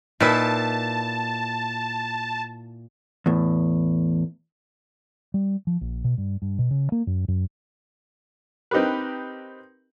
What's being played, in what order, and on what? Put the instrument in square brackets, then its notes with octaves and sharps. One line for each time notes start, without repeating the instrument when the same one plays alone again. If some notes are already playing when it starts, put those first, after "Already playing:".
[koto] A#2 E4 [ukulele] D#4 B4 [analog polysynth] A5
[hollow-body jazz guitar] E2 A2
[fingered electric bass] G3
F3
A#1
B2
G2
G2
B2
C#3
A#3
F#2
F#2
[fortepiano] C4 D#4 G4 A#4 B4